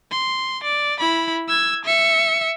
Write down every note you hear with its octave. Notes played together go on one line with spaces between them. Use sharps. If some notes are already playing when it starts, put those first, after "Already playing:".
C6
D5
E4 B5
E6 G#6
E5 C#7